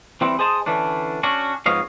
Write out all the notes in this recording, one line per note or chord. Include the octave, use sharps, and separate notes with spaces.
E3 G3 C4 E4
G#4 C5 D#5 A5
D3 E3 C#4 D4
C#4 D4 F#4
G#2 F3 B3 C#5 D#5 F5